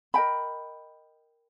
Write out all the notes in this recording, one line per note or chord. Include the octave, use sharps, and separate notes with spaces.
A#4 D#5 G5 B5